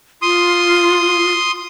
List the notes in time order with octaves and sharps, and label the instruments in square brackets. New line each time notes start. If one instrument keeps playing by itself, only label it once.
[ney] F4 [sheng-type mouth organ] C6 D#6